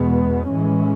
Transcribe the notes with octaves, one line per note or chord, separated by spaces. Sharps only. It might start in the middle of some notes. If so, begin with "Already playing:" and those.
Already playing: E2 B2 G#3 B3
A2 E3 G#3 C#4